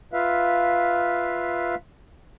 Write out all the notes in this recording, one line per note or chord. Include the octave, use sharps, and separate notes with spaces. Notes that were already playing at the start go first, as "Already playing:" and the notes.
F4 B4 E5 F5